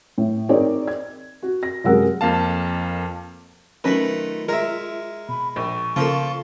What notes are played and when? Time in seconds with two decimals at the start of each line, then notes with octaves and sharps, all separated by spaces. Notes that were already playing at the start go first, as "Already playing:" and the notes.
0.18 A2
0.49 C4 D#4 G#4 A#4 C#5 D5
0.88 G#6
1.43 F#4
1.63 A#6
1.84 F#2 C3 G#3 A#4 F#5 E6
2.21 F2 A#3 F5 A5
3.84 D#3 F#3 A3 C#4 F4 B4 B5
4.48 G#3 A#4 E5
5.29 B2 B5
5.56 A#1 C#6
5.96 C#3 F3 A#3 F4 A4